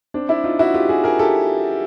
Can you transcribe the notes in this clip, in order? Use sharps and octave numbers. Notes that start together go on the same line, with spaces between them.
C4 D4
D4 E4
D#4 F4
E4 F#4
F4 G4
F#4 G#4
G#4 A#4
G4 A4